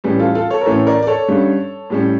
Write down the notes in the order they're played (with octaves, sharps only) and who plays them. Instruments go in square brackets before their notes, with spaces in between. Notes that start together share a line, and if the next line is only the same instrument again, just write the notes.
[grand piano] A2 E3 G3 C#4
F4 A4
F4 A4
A4 C#5
A#4
A2 E3 A3 C#4 A4 C#5
A#4 D5
D5
A4 C#5
G2 D3 G3 C#4
A2 G3 C#4